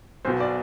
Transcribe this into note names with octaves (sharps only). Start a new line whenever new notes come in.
B1 B2 C5
D5